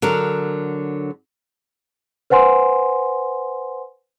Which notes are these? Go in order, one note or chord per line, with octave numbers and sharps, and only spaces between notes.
D3 F#3 A#4
B4 C5 F#5 G#5 C6